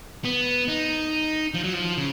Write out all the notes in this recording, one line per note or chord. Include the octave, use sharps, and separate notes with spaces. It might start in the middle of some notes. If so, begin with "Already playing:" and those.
B3
D#4
F3
F#3
F3
C#3